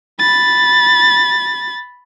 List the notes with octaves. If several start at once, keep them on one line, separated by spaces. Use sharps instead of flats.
B5 A6